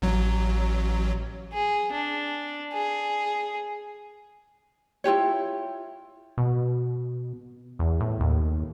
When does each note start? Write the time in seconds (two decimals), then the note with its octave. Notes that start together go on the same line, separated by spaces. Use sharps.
0.02 A1 F#3
1.53 G#4
1.92 D4
2.73 G#4
5.04 E4 F4 G4 C#5
6.38 B2
7.79 E2
8.01 A2
8.20 D#2